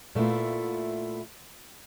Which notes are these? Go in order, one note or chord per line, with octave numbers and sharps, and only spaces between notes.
A#2 A3 B3 E4 F4